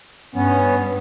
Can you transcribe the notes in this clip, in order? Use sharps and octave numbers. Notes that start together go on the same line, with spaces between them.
G2 B3 C#4